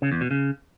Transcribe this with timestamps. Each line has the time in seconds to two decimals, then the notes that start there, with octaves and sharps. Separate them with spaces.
0.02 C#3
0.12 E2
0.21 B2
0.31 C#3